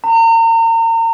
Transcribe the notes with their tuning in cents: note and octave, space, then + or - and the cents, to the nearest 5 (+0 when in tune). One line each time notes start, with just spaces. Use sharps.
A#5 -35